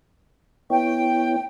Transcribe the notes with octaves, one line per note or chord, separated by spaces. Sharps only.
B3 E4 C#5 G5